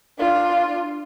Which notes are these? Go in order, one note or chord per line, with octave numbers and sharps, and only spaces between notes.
D4 F4